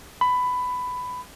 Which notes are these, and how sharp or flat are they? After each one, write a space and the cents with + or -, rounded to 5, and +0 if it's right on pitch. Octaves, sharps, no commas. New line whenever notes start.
B5 +15